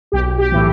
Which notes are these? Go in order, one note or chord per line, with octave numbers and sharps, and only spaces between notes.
B1 G4
G4
A2 E3